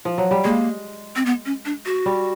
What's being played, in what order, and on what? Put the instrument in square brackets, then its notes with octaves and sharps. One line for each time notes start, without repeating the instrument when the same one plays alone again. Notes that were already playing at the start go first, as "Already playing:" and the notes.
[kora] F3
F#3
G3
[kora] G#3 [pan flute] A#3
[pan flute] C4
B3
C#4
D4
F#4
[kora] G3